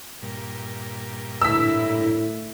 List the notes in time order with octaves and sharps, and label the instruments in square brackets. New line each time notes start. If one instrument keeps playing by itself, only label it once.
[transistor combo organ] G2 A#2
[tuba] A2 [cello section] D3 E4 [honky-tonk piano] E6 B6